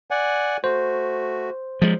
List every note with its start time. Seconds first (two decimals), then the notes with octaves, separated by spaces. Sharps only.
0.11 D5 F#5 G#5
0.64 A3 F#4 C5
1.82 F3 G#3